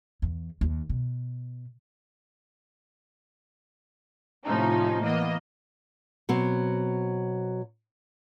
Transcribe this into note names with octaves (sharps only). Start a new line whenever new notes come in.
E2
D#2
B2
A2 C3 F3 C#4 D#4
E3 A#3 B3 D#5
B2 F#3 C4